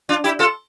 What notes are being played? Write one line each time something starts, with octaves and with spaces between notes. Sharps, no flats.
D4 F4
E4 G4
F4 A4